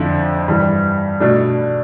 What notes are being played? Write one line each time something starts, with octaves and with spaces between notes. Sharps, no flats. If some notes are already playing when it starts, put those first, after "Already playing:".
Already playing: F2 D3 F3 C4 E4
G2 E3 G3
B2 A3 D4